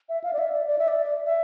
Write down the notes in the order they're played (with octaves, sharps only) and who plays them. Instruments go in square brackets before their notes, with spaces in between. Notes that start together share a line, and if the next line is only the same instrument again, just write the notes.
[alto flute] E5
F5
D5
E5
D5
D5
E5
D5
E5